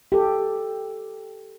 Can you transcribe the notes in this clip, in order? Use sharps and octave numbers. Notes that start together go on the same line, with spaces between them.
G4 A4